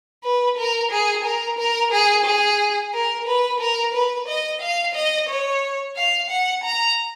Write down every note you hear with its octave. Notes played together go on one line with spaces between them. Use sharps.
B4
A#4
G#4
A#4
A#4
G#4
G#4
A#4
B4
A#4
B4
D#5
F5
D#5
C#5
F5
F#5
A#5